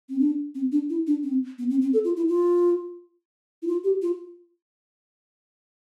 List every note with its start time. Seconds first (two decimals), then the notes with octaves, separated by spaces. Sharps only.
0.09 C4
0.20 D4
0.55 C4
0.72 D4
0.90 E4
1.07 D4
1.23 C4
1.59 B3
1.70 C4
1.82 C4
1.93 A4
2.04 F4
2.17 E4
2.28 F4
3.62 E4
3.67 F4
3.84 G4
4.02 F4